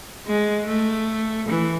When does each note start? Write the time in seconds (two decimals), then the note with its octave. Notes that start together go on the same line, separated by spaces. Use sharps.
0.27 G#3
0.67 A3
1.49 E3